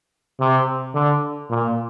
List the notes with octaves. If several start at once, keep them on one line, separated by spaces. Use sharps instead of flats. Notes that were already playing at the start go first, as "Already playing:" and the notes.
C3
D3
A#2